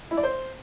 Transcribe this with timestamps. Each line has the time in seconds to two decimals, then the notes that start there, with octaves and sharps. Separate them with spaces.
0.11 E4
0.17 D5
0.23 C5